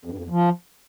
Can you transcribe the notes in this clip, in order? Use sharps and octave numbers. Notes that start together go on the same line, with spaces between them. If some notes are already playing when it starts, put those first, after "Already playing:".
F2
G2
F2
E2
F3